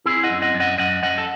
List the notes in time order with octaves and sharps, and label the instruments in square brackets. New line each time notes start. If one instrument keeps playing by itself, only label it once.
[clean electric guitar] C4 E4 G#4
D#5 F#5
F#2
D#5 F#5
F#2
D#5 F#5
F#2 D#5 F#5
F#2 D#5 F#5
A4